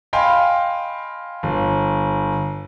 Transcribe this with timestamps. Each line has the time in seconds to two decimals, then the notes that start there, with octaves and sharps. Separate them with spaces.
0.13 D#5 F5 G5 G#5 B5 C6
1.43 G1